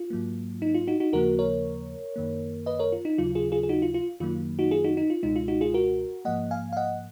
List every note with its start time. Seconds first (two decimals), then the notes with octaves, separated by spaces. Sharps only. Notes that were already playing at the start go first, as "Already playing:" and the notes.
Already playing: F4
0.10 G#2 F#3 A#3
0.62 D#4
0.74 F4
0.87 D#4 F#4
1.00 D#4 F#4
1.13 D#2 C#3 F3 A#3 F#4 A#4
1.39 A#4 C#5
2.16 F#2 D#3 A#3
2.66 B4 D#5
2.79 A#4 C#5
2.92 F4
3.05 D#4
3.18 D#2 C#3 F#3 F4
3.35 F4 G#4
3.52 F4 G#4
3.63 G#4
3.69 D#4 F#4
3.82 F4
3.94 F4
4.20 F#2 D#3 F#3 A#3 F4
4.59 D#4 F#4
4.71 F4 G#4
4.84 D#4 F#4
4.97 D#4
5.10 F4
5.23 C#2 B2 G#3 D#4
5.36 F4
5.48 D#4 F#4
5.61 F4 G#4
5.74 F#4 A#4
6.25 G#2 F3 A#3 D#5 F#5
6.51 F5 G#5
6.73 F5
6.77 D#5 F#5